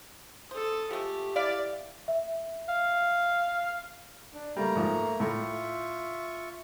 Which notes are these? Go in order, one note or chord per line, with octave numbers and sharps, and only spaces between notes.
A4 C5 D#6
F3 G#3 A3 G4
E4 D5 F5
E5
F5
D4
G3 A3 A#3 A#5
G#2 F3
A2 F4 E5 C#6